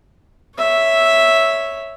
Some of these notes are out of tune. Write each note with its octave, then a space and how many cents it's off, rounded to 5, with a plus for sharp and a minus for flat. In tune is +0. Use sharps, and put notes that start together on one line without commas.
C#5 +0 E5 -5